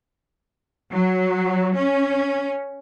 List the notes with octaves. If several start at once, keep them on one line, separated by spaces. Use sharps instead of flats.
F#3
C#4